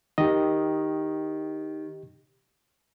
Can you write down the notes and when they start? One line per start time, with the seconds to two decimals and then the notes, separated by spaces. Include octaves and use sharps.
0.18 D#3 G4 D#5